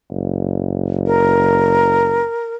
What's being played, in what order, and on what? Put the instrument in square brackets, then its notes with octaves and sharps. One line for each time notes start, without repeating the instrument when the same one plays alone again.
[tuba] F#1
[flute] A#4